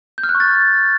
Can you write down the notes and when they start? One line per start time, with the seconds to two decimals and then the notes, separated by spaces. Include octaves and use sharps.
0.18 G6
0.23 F6
0.29 F#6
0.35 C#6
0.40 A6